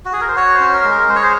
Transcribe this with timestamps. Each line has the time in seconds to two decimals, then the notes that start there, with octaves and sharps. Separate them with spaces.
0.05 F#4
0.13 G#4
0.21 A#4
0.28 C5
0.36 F#4 C#5
0.54 C5
0.60 C#4
0.73 A#4
0.84 G#3
0.91 A#4
1.09 G#3 C5
1.16 C#5
1.23 C5